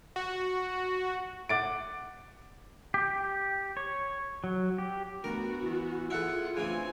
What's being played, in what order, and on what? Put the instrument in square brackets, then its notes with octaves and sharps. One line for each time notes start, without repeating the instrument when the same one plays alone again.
[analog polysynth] F#4
[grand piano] F#5 D6 A6 D7
[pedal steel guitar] G4
C#5
F#3
G4
[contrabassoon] D2 [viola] B3 [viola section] F#4 [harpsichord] A#4
[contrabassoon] E3
[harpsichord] E4 A4 [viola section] F4 [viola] G#4 F#5
[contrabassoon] D2 [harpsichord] C#3 E3 [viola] C4 G#5